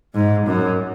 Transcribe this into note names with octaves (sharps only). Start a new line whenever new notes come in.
G#2
F#2